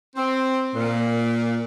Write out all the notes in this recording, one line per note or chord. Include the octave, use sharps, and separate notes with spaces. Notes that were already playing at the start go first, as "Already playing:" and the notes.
C4
A#2